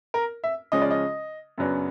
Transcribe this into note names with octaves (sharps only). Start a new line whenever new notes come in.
A#4
E5
C#3 F3 G#3 C#4 D#5
D5
D#5
F#2 C#3 F#3 B3 D4